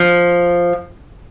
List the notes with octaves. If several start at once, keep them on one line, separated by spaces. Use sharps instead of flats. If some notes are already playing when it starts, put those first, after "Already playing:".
Already playing: F3